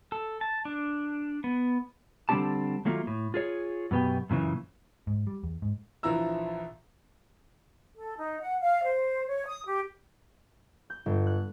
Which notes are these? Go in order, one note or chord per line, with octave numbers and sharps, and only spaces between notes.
A4
A5
D4
B3
D3 G3 C4 D4 G4 A5
D#3 F#3 A3 A#3 F4
A2
F4 G#4 C#5
F#2 B2 B3 G4 G5
F#2 A#2 C#3 E3
G#2
G3
E2
G#2
A#1 E3 F3 E4 A#5 E6
A4
D#4
F#5
F5
C5
C#5
D#6
G4
G6
G1
F#6